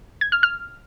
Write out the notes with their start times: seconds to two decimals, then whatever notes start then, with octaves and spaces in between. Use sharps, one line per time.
0.21 G#6
0.32 F6
0.43 F6